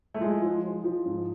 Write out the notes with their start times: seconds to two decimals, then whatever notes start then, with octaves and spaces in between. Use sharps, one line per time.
0.14 A3
0.20 F3 G#3
0.42 F3
0.63 F3
0.84 F3
1.05 G#2